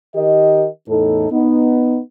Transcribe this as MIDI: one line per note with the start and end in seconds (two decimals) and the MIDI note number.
0.15 0.66 51
0.15 0.66 67
0.15 0.66 70
0.15 0.66 75
0.88 1.29 40
0.88 1.29 45
0.88 1.29 63
0.88 1.29 69
1.31 1.99 59
1.31 1.99 63